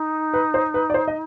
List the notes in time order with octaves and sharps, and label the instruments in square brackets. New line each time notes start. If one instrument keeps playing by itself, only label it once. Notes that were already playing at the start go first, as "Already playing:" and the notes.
Already playing: [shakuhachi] D#4
[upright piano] B4
C5
B4
D5
C5
D#5